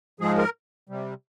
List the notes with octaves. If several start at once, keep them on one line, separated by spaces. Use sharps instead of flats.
G#2 F3 G#3 G#4
A#4
C3 G3